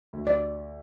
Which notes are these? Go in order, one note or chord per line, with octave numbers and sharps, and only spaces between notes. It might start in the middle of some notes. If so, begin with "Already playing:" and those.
D2
D5